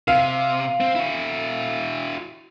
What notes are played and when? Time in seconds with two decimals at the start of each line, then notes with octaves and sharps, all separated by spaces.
0.08 C3 F5
0.80 C4
0.95 E4 F#4